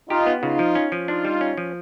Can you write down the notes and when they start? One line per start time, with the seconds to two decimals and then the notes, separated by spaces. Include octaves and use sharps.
0.09 D#4 F4 G4
0.26 B3
0.42 C#3 D#4 F4
0.59 F3
0.75 C#4
0.92 F3
1.08 D4 D#4 F4
1.25 G3
1.41 C#4
1.57 F3